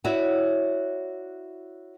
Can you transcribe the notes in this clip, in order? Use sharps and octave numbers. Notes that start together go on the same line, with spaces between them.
E4 F#4 C#5 D5 E5 F#5